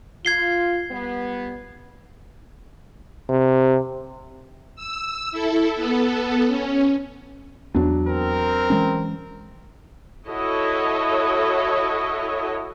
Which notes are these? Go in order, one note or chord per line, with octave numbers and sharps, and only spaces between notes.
F4 G#6 C7 G7
G3 B3
C3
E6
E4 A4
B3 A4
C#4
E2 F#3 B3 D4
C4 A#4
E3 G#3 C#4
E4 F#4 A4 C#5 D#5